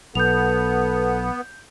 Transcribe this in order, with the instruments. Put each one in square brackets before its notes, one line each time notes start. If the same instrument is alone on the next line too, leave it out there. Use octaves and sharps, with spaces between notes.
[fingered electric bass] B1 [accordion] B3 [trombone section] A4 [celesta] G6 F7